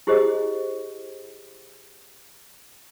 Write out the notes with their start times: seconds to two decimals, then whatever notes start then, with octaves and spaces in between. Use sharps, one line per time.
0.07 E4 G4 G#4 C5 D#5